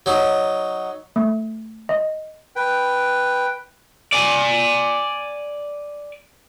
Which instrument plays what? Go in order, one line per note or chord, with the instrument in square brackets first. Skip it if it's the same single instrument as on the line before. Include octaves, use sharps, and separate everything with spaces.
[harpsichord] F#3 D#4
[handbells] A3
D#5
[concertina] B4 G5
[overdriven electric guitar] D5 G#5